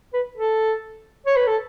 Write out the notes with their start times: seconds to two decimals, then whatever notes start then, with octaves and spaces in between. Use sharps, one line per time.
0.13 B4
0.38 A4
1.26 C#5
1.36 B4
1.47 A4